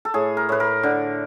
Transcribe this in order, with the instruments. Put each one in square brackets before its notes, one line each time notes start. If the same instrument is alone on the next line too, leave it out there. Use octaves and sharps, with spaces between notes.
[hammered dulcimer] A4
A2 G#4
A#4
A2 B4
A#4
D3